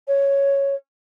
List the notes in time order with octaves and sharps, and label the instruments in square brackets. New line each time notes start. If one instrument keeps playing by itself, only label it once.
[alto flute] C#5